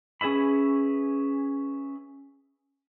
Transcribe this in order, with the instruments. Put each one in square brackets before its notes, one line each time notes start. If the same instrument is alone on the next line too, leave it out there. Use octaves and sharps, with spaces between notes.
[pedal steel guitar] C#4 G#4 B4 E5 B5